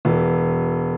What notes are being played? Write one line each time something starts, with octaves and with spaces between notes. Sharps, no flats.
E1 E3